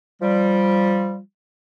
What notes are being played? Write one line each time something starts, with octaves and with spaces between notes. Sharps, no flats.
F3 G3